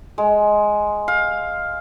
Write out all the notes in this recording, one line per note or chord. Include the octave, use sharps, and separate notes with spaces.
G#3
F5